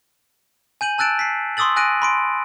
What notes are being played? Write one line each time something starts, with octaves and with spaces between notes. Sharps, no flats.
G#5 G6 D#7 F#7
A5 E6 F#6 A6 D7 E7
B6 C7
C6 C#6 D#6 E6 A6 F#7
G#5 F#6 A#6 D7 D#7
B5 C6 D7